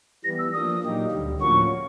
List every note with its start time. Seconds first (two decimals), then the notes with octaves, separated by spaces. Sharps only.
0.24 E3 G3 B3 A#6
0.39 E6
0.54 F3 A#3 D4 D#6
0.82 A#2 F#3 A#3 D#4 G4
1.12 D2 D3 G3
1.40 A2 F3 A#3 C#4 F#4 C#6